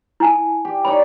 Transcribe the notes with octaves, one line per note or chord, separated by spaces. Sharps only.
E4 G#5 A5
G4
D#4 C#5 D5 B5